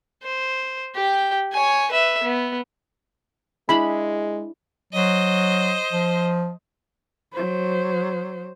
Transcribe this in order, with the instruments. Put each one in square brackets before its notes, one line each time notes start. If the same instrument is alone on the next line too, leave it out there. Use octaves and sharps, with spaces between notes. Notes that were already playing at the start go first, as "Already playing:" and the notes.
[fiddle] C5
G4 G5
C#5 G#5
B4 E5
B3
[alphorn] G#3 [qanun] D4 E4 G#4 [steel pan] B5
[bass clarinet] F#3 [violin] C5 D#5
[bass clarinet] F3
[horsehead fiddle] F#3 C5